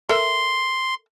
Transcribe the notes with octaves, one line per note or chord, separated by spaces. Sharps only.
A4 A#4 E5 C6